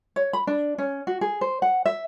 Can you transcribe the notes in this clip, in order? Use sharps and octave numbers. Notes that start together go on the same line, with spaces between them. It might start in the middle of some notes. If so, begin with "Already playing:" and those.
C#5
B5
D4
C#4
F#4
G#4
C5
F#5
E5